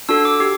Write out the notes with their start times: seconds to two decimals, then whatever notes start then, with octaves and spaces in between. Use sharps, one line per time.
0.09 D4 F#4 A4 E6
0.25 D6
0.40 G4